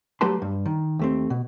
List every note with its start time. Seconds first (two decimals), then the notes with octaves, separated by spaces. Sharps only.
0.21 F#3 A3 G4 B4 A5 C6
0.42 G2
0.66 D#3
0.99 D#2 A3 C4
1.30 B2